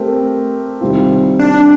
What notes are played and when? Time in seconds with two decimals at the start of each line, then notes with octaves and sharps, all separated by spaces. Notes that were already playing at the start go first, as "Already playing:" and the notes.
Already playing: A3 C4 G4 A#4
0.81 C3 D#3 G3 C4 F4
1.39 D4